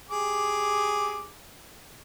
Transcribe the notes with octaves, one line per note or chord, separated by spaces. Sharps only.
G4 G#4 D6